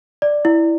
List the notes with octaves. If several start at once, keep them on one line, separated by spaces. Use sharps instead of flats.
D5
E4